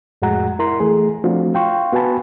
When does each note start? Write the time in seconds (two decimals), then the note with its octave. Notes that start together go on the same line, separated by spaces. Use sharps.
0.22 F2 A2 G#3 F#4 F#5 A#5
0.59 E4 A#4 A#5 C6
0.80 E3 A3 G#4
1.24 F3 A3 C4 D4 F4 F#4
1.54 F5 G5 C6 C#6
1.93 B3 F#4 B4 G#5 A5 B5